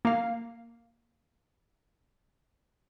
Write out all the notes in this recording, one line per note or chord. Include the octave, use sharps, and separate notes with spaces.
A#3 F5